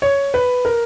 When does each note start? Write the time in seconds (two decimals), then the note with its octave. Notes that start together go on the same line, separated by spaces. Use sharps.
0.02 C#5
0.34 B4
0.65 A#4